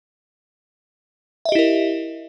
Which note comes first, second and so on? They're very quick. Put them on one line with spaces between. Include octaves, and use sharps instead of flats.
E5 D#5 G4 E4 A#4